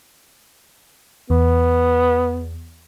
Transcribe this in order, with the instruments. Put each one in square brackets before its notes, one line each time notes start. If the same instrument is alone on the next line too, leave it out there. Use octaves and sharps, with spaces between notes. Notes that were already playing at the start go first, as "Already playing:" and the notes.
[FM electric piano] E2 [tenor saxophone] B3